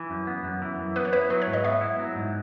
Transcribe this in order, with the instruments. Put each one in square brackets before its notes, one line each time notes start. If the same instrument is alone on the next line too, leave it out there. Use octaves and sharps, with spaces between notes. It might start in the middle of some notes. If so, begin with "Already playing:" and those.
Already playing: [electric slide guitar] E3
F#2
B3
F#2
E3
F#2
[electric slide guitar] B3 [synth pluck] B4
[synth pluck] C#5
[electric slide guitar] E4 [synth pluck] B4
[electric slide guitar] F#3 [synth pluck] B4
[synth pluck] C#5
[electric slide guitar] G#2
[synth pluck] D#5
[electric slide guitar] B3 [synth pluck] E5
[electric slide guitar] E4
F#3
G#2